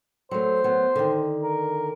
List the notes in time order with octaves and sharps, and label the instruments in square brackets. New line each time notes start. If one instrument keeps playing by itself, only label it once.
[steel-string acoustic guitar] F#3 A3 [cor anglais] C5
[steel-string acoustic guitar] F#3 B3
D3 D#3
[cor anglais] A#4